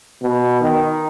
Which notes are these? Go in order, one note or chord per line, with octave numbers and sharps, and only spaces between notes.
B2
D#3